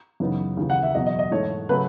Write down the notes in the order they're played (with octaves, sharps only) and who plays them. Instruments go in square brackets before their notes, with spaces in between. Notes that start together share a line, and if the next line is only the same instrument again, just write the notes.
[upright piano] F#2 C#3 E3 B3 D#4
D#2 C#3 E3
F#5
E5
E2 B2 F#3 D#5
D#5
D#5
G#2 E3 A3 C#5
C#3 F#3 A3 B4